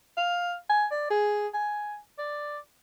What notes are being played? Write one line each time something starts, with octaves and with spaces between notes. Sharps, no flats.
F5
G#5
D5
G#4
G#5
D5